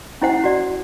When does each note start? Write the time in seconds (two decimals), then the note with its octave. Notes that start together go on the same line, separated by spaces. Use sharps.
0.22 C#4 E4 C5 F#5
0.44 F#4 D5